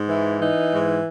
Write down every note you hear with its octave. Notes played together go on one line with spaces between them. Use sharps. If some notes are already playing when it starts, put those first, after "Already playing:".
Already playing: G#2
E3
E3 D#4
G#2